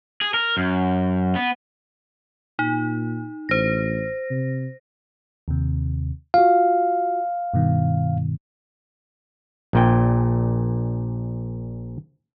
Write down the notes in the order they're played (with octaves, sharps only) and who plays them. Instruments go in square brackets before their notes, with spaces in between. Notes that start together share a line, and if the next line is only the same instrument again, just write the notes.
[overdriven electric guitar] G#4
A#4
F#2
B3
[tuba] A#2 [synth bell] D#4
[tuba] A1 [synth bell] C5 A#6
[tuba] C3
[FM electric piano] D#2 C3
[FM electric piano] F4 F#4 [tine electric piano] F5
[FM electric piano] G2 B2 D#3
[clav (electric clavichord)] A#1 A#2 G5